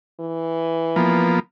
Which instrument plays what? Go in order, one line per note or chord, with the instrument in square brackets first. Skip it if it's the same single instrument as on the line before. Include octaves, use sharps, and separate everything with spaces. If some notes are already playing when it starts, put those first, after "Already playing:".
[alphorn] E3
[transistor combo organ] F3 A#3 B3